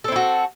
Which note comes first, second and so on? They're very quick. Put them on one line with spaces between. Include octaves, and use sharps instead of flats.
A4 C4 E4 F#4